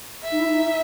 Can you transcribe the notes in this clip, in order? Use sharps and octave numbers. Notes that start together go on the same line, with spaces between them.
E5
D#4
E4
D#4